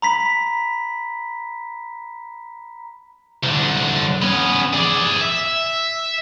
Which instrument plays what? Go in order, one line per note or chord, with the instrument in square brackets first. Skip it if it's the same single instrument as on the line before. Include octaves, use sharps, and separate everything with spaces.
[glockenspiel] A#5 B5 B6
[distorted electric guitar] C2 D3
B3 C#4
G#4 D5
E5